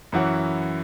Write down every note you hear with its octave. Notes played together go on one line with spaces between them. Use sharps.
F#2 E3 E4 F#4 C#5